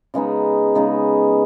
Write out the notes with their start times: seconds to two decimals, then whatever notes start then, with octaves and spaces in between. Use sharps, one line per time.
0.14 C#3 G#3 B3 D#4
0.75 C#3 G#3 B3 D#4